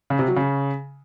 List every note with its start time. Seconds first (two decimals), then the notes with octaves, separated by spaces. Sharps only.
0.10 C#3
0.19 C3
0.28 F#3
0.36 C#3